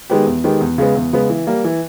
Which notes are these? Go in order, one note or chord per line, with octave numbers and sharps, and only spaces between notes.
D#3 G#3 B3 G4
E2
D#3 G#3 B3 G4
E2
C#3 G#3 B3
E2
C#3 G#3 B3
E3
G3 A#3
E3